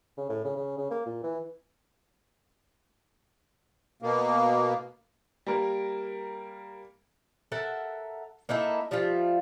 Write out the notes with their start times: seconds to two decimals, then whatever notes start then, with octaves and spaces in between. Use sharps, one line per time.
0.18 C#3
0.29 A2
0.45 C#3
0.56 C#3
0.78 C#3
0.91 A#3
1.06 A#2
1.23 E3
4.02 B2 A#3
5.46 G3 A#3 A#4
7.52 A4 A#4 E5 F#5
8.49 A#3 D#4 E4 A4
8.91 F3 G3 A3 F4